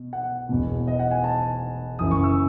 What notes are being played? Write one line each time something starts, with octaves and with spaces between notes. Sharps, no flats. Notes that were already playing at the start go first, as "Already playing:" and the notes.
Already playing: B2
F#5
E1 E2 B2
D#5
F#5
G#5
A5
F#1 F#2 E3 D#6
C#6
E6